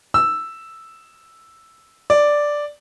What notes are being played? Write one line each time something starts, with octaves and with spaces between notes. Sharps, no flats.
E6
D5